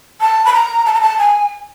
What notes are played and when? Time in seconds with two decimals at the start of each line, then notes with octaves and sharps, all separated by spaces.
0.21 A5
0.45 B5
0.53 A#5
0.86 A5
0.94 A#5
1.01 A5
1.19 G#5